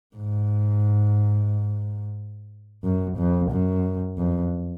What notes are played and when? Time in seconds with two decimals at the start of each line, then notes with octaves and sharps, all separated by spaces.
0.16 G#2
2.84 F#2
3.18 F2
3.51 F#2
4.18 F2